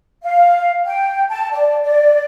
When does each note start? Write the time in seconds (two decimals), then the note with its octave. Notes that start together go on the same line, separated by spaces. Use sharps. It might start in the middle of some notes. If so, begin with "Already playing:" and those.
0.23 F5
0.85 G5
1.29 A5
1.51 D5
1.83 D5